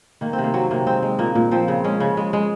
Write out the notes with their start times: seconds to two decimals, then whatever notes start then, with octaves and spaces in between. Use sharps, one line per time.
0.21 D#3 A#3
0.33 C4
0.38 C3
0.44 A#3
0.54 F#3 C4
0.71 C3 A#3
0.87 G#3 C4
1.03 G#3
1.19 A#2 A#3
1.35 A#2
1.51 F3 C4
1.68 C#3
1.84 G#3 C#4
2.00 C#3
2.17 G#3
2.33 G#3